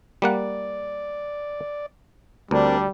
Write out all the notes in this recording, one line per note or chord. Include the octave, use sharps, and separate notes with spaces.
G3 A#3 D5 F#5
D2 G3 C4 D4 A#4